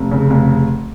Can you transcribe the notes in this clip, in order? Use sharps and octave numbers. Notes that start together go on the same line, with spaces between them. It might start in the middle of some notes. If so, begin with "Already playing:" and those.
Already playing: F1
C#3
F1